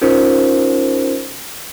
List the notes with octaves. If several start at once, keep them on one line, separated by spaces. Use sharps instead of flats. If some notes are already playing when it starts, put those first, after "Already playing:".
C#4 D#4 F4 A#4 C5